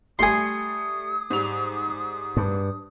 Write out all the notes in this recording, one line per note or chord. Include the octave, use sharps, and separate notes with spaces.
G3 A3 G#4 C6 D#6
G#2 G3 F7
G2